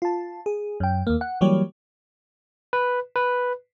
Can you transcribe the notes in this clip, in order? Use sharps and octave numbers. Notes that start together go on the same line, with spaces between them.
F4 A5
G#4
F#2 G5
D#2 A#3
F#5
E3 F#3 G3 A#3 G4 C#5
B4
B4